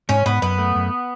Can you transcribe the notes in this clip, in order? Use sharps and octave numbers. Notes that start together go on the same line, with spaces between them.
G#2 C#4
G#2 B3
F#2 B3
A3
F#2